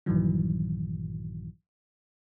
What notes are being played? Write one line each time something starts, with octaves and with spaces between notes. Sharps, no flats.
A#1 G2 A#2 D#3 E3 F#3